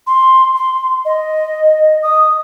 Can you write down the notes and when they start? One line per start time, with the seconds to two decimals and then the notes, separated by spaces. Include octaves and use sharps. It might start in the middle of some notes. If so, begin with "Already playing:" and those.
0.07 C6
0.56 C6
1.05 D#5
2.03 D#6